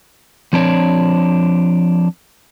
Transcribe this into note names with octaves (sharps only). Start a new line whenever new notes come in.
F3 C4 D4 C#5